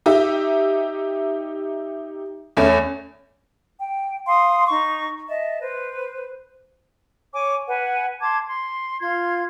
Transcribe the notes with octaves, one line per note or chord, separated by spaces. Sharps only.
D#4 G4 E5
E2 A3 C#4
G5
F5 C6 D#6
D#4 C#6
D#5 E5 A5
B4 C5
C#5 G#5 D6
B4 F#5 G#5
A5 C6 D6 G#6
C6
F4 C6 G#6